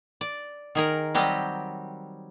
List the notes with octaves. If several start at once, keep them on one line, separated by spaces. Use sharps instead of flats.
D5
D#3 G#4 A#4
F#3 G3 C4 G4 D#5